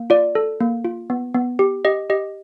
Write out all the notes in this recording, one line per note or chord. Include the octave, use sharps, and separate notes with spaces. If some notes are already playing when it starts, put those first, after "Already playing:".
Already playing: A#3
F4 D5
A4
A#3
F4
B3
B3
G4
G4 D#5
G4 D#5